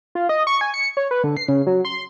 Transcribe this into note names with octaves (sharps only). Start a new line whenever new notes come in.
F4
D#5
C#6
G#5
C#7
C#5
B4
D3
C7
C#3
F#3
C6